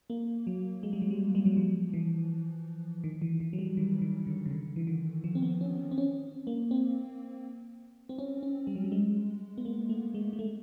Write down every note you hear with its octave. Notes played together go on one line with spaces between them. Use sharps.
A#3
F#3
G#3
G3
F#3
G3
G3
F#3
F3
E3
D#3
E3
E3
F#3
G3
D#3
D#3
D3
C#3
D3
E3
D#3
F3
C4
B3
C#4
C4
C#4
A#3
C4
C4
C#4
C#4
G3
F#3
G3
G#3
B3
A#3
A3
G#3
G#3
A3